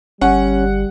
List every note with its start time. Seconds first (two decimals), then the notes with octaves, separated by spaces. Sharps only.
0.21 G1 G3 C#4 F#5